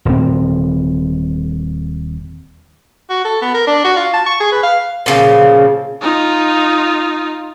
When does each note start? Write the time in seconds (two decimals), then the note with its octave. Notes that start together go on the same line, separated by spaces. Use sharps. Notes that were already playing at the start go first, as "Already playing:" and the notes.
0.05 D#1 C4
3.10 F#4
3.25 A4
3.42 B3
3.54 A#4
3.67 D4
3.84 F#4
3.97 F4
4.14 A5
4.27 C#6
4.40 G#4
4.52 B4
4.63 F5
5.06 A#2 C#3 F3
6.02 D#4 F4